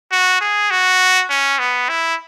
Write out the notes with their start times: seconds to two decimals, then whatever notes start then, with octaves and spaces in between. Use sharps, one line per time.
0.12 F#4
0.41 G#4
0.71 F#4
1.30 C#4
1.59 B3
1.89 E4